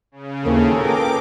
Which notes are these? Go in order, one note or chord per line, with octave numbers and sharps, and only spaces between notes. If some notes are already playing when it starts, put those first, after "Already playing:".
C#3
D#2 A#3 C4 E4 G#4 A4
A#2 A#4 B4 G5 D6